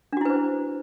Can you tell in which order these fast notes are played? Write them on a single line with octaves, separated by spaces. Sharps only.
D4 F#4 E4 B4 C5